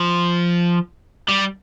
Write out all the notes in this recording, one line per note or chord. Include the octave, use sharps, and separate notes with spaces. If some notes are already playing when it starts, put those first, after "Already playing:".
Already playing: F3
G3